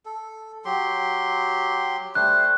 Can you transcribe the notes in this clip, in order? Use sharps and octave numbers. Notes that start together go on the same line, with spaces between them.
A4
F#3 G4 C6
G3 A3 C5 F#6